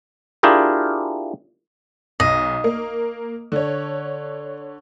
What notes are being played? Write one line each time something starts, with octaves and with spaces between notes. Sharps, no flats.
D4 E4 F4 G4 G#4 A#4
B1 D#5
A#3
D3 C#5